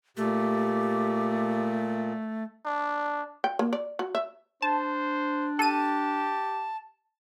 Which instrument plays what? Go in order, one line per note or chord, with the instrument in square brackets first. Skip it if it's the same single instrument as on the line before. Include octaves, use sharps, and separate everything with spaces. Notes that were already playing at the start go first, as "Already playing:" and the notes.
[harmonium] A#2 [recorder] A3 [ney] G4
[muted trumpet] D4
[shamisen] G5
A#3
D5
F#4
E5
[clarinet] D4 [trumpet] C5 [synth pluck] A5
[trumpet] G4 [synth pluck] A4 D#7 [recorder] A5